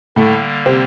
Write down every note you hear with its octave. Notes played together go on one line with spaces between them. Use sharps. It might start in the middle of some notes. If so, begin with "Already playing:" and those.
A2 D3 G3 A3 A#3
C3 C4